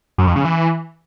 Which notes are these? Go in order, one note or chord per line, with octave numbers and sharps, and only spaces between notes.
F#2
F2
C#3
E3